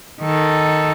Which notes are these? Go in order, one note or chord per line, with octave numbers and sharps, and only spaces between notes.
D#3 A4